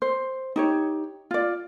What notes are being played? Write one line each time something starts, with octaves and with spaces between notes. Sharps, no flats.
C5
D#4 G4 C#5
F4 D5